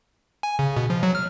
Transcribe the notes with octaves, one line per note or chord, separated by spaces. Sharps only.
G#5
C#3
B2
F3
F#3
F6